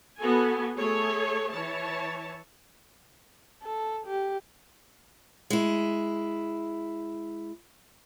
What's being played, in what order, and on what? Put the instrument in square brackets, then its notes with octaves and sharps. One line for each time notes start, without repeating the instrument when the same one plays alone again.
[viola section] B3 F#4 A4 G#5
A3 G#4 A4 C#5
E3 C#5 A5
[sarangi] A4
G4
[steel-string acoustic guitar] G#3 E4